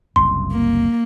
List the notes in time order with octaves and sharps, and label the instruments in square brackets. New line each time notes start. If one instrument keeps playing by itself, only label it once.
[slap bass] F#1 C2 F#2 [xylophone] C6
[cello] A#3